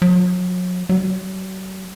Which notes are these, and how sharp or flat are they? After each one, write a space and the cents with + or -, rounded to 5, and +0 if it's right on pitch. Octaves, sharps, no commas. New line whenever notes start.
F#3 -35
F#3 +40